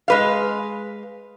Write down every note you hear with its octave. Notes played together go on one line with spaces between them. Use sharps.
G#3 B4 F5